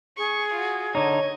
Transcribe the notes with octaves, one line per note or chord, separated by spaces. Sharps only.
G#4 C#6 C#7
F4 F#4
D3 D#4 C#5 D#5 G#6